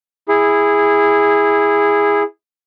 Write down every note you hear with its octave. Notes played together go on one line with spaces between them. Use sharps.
E4 G#4